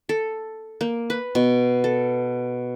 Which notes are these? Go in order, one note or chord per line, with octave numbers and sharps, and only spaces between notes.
A4
A#3
B4
B2
A4